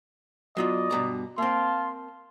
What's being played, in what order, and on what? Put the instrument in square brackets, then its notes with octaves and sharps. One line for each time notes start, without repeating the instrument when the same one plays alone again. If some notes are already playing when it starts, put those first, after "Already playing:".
[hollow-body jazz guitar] F#3 B3 F4 [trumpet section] D5 D#5
[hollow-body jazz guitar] G2 B2 A#5
[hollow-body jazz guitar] A#3 C4 [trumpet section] F5 A5 C6